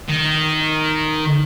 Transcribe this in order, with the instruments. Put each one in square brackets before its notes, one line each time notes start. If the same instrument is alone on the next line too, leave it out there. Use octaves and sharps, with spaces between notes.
[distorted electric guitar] D#3